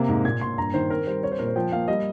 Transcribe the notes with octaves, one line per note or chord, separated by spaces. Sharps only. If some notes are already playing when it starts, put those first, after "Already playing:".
Already playing: C3 A#3
G#2
A#2 G#6
A#2 C6
G2 A#5
D#3 C5
C4 A#4
G3 C5
C4 C#5
C5
A#2 A#4
C5
F3 G5
A#3 F5
G3 D#5